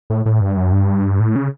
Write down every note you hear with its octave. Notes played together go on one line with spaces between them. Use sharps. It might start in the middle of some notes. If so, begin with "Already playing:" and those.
A2
A2
G2
F#2
G2
A2
C#3